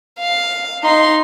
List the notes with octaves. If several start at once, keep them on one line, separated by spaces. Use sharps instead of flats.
F5
D#4 C6